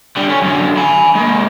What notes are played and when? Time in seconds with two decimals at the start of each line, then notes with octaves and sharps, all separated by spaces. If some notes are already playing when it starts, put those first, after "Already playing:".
0.16 D3 G3
0.29 C#4 C#5
0.42 F#2 D3
0.77 G#5 B5
1.15 G#3 A#3